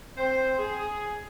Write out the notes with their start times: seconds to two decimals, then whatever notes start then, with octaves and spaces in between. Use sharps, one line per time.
0.17 C4 C5
0.59 G#4